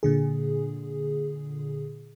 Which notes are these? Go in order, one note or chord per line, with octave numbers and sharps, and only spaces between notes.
A#2 D3 G#4